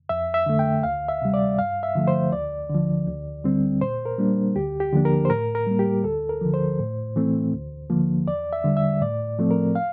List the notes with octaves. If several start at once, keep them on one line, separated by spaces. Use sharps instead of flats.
F2 E5
E5
D3 A3
G5
D2 F5
E5
C3 G3
D5
G2 F5
E5
D3 F3 A3
C5
D2 D5
D3 F3
D2
D3 G3 C4
A#2 C5
A#4
G3 A#3 D4
D2 G4
G4
D3 F3 A#3 D4
A#4
C5
A2 A#4
A#4
G3 A#3
G4
D2 A4
A#4
D3 F3
C5
A2
E3 A3 C4
D2
D3 F3 A#3
E2 D5
E5
D3 G3
E5
A2 D5
F3 A3 C4
A#4
F5